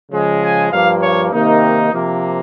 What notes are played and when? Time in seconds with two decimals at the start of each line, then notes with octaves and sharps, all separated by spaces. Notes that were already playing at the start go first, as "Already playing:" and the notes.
0.11 C#3 F3 G#3
0.41 G#5
0.71 G2 F3 A#3 F5
1.01 C#5
1.31 C3 D#3 A#3 D#4
1.92 C3 F3 A#3